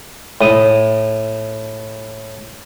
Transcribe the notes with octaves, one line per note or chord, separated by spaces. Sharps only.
A2 D#6